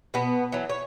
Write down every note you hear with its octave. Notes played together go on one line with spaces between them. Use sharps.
B2 B3
E3 F#3
C#5